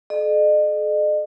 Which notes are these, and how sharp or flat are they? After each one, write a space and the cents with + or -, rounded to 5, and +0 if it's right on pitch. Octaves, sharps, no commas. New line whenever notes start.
A4 -45 D#5 -45